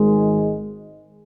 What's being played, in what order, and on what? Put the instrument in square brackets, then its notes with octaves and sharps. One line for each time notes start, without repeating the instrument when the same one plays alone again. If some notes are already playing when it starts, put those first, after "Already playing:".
Already playing: [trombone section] G#1 G#2 D#3 G#3